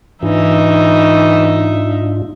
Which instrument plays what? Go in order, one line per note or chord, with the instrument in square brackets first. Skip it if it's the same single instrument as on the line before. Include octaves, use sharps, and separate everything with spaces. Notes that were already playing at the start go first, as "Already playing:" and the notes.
[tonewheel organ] G#2 D4 F4 [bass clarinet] E3 [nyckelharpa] D#4 E5